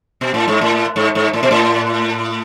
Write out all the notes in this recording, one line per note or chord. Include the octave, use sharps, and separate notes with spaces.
B2
A2
G#2
A2
G#2
G#2
A2
B2
A2